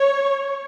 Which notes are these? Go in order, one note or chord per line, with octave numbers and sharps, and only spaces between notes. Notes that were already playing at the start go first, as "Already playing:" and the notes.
Already playing: C#5